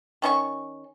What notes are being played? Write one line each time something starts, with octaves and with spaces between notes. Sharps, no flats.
D#3 C#4 E4 C#6